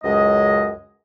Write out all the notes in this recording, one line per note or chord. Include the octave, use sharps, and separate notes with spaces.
C#2 F#2 G#3 D#5